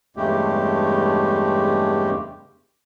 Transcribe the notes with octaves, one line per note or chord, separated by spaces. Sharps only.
E2 G2 C#3 G#3 A3 G4